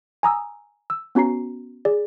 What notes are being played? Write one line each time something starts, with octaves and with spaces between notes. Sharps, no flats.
G#5 A#5 D#6 E6
E6
B3 C#4 F#4 A#5 C7
G#4 D5